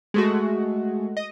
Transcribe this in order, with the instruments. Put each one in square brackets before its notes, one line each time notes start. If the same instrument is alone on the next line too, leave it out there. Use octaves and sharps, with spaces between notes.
[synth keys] G#3 A3 F#4
D#5